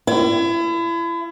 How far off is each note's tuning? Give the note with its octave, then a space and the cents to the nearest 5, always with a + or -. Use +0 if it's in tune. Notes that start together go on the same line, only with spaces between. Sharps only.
E4 +35